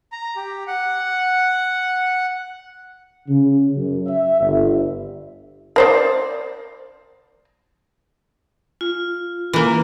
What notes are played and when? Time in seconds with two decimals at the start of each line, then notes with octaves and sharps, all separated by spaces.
0.12 A#5
0.36 G4
0.67 F#5
3.28 C#3
3.76 F#2
4.07 E5
4.40 G1
5.76 A#4 C5 D5
8.81 F4
9.53 E3 A#3